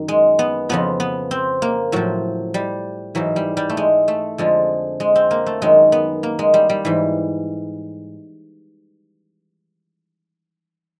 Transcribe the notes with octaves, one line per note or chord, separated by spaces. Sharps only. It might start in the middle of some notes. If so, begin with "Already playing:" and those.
Already playing: F#2 D#3
G#3
B3
F2 C#3 F3 B3
B3
C4
A#3
A2 F3 F#3
G3
G#2 E3 F#3
G3
G3
A3
G#3
A3
F2 D3 F3 G#3
G#3
C4
A#3
A3
F#2 D#3 F#3 G#3
B3
A#3
G#3
G3
G3
G#2 E3